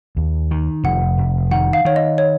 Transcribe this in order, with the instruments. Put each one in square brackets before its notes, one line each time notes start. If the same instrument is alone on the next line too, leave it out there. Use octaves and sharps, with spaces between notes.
[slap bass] D#2
D#3
[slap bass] F1 [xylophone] F#5
[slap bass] F1
[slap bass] D#3 [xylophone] F#5
[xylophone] F5
[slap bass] D#3 [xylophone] C#5
[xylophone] D#5
C#5